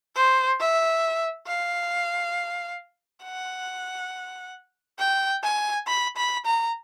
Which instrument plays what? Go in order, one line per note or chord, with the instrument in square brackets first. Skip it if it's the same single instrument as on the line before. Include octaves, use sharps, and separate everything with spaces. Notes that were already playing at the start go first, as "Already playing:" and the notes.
[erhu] C5
E5
F5
F#5
G5
G#5
B5
B5
A#5